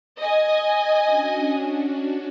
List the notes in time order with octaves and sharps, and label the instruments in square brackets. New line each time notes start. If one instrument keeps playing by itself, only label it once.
[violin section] D#5 G#5
[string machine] C#4 D4 F#4